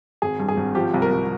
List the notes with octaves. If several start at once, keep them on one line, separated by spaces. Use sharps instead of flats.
G#1 G#4
G2
G#4
G#1
F3 G4
C2
A#4
C2